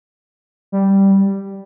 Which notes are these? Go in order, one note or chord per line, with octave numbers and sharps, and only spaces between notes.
G3